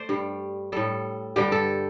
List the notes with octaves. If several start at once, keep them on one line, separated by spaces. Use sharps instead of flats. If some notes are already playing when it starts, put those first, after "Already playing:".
Already playing: A3 C5 D5
G2 G3
A2 G3 A4
G2 D3 G3 G4
A4